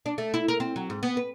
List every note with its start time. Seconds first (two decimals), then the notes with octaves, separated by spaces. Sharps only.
0.06 D4
0.18 A3
0.34 E4
0.48 A#4
0.60 C4
0.76 F#3
0.90 G#2
1.03 B3
1.17 B4